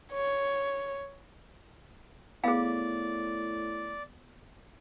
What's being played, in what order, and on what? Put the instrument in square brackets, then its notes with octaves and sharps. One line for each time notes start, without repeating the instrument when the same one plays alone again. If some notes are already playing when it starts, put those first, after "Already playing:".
[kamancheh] C#5
[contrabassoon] A2 [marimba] B3 [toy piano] G#4 F5 [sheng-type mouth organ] D5